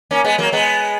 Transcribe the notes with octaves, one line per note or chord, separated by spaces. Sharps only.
A#3 C#4
G#3 B3
F#3 A#3
G#3 B3